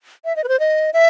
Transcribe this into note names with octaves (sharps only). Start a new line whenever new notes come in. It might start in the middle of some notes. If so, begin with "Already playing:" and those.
E5
D#5
B4
C5
D#5
E5